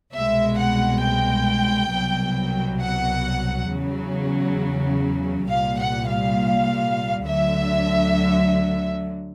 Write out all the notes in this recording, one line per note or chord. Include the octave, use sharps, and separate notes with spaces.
C2 B2 G#3 E5
F#5
G5
C2 B2 F#3
F#5
E2 C#3 F#3
C2 A#2 G3 F5
F#5
F5
D2 D3 F#3 E5